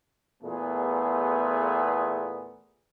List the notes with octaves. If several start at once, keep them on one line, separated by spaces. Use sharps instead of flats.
E2 A#2 A3 B3 G#4